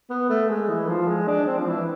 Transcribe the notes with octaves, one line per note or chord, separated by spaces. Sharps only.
B3
A3
G#3
E3
F3
G#3
D4
C4
F3
E3